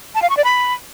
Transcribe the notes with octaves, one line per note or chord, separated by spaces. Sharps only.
A5
F5
C#6
D5
B5